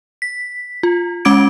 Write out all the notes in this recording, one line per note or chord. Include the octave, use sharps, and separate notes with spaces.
B6
F4
G#3 C#4 D6 G#6 D7